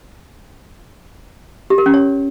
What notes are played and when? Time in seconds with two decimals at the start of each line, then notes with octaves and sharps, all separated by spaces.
1.70 G4
1.78 A#4
1.86 C#4
1.94 C#5